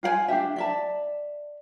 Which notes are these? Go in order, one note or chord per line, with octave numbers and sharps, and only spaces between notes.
F4 F5 F#5 G#5
D4 F4 G4 E5
D5 E5 A5